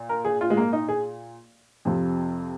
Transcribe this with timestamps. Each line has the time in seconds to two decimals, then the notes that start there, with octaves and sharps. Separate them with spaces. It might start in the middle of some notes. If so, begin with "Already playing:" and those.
Already playing: A#2
0.09 A#4
0.25 G#4
0.41 F4
0.50 G#3
0.57 A#3
0.73 D#4
0.89 G#4
1.85 F2 C3 F3